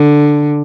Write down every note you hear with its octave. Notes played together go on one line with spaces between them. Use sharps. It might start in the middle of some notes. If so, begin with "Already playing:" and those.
Already playing: D3